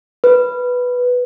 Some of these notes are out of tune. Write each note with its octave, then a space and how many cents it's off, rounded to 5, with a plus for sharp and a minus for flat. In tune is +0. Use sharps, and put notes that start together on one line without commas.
B4 +0